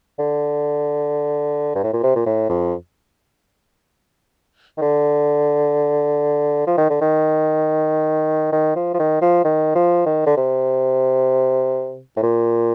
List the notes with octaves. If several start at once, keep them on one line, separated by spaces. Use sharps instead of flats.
D3
G2
A2
A#2
C3
A#2
A2
F2
D#3
D3
F3
D#3
D3
D#3
D#3
F3
F3
D#3
F3
D#3
F3
D#3
D3
C3
A2
A#2